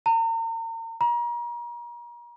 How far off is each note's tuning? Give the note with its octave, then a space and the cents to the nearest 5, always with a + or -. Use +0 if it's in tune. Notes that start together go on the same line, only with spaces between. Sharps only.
A#5 -40
A#5 +35